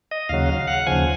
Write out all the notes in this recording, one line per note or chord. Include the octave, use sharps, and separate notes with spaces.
D#5
D#2 C#3 F#3 F5
F5
F#5
D#2 C#3 F3 G#5